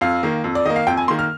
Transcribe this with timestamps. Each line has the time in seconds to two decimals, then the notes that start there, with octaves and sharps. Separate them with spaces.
0.01 F2 F5
0.23 D#3 A#3
0.44 F2
0.55 D5
0.65 D#3 A#3 D#5
0.76 F5
0.87 F2 G5
0.97 G#5
1.08 D#3 A#3 C6
1.19 F6